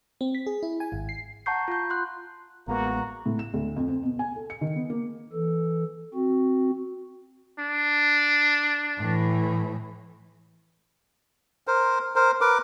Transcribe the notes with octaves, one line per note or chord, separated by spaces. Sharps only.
C4
B6
G#4
E4
G#5
G#1
C7
F#5 A5 A#5 C#6 G6 C7
F4 G6
C6 F#6
A1 G#3 A#3 B3 F#4 A#5
A2
E7
D2
F2
C4
B2
G#5
A4
C#7
D#3
B3
A#3
E3 A4
C4 F#4
D4
A2 E3
A#4 C5
A#4 C5
A#4 B4 D6